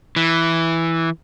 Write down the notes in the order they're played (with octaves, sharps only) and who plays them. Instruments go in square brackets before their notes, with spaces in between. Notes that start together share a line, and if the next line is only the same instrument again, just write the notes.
[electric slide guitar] E3